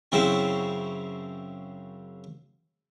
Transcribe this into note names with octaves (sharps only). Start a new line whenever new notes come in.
F#2 C#3 C4 E4